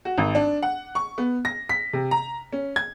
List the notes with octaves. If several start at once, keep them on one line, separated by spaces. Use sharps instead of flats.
F#4
G#1
D4
F#5
C#6
B3
A#6
B6
C3
A#5
C#4
G#6